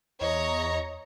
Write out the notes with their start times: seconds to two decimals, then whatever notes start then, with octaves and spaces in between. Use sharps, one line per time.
0.21 E2 C#5 D#5 A#5